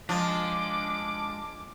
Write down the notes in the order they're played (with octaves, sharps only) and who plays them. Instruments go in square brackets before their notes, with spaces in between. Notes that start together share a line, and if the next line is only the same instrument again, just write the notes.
[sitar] F3 [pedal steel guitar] G#3 D4 [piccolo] D6